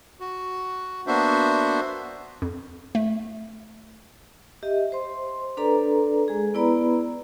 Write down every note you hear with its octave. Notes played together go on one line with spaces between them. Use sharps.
F#4
A#3 B3 D4 F#4 C5 E5
F2
A3
G4 D#5 E5
C5 C6
D4 A4 B4 D5 A#5
G#3 G#4
B3 E4 B4 D5 A#5 B5